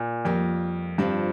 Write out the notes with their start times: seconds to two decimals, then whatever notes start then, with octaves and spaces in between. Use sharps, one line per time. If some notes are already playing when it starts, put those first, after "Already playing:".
Already playing: A#2
0.25 F2 G3 A#3 F4 A#4
0.98 G2 D3 F3 C4 F4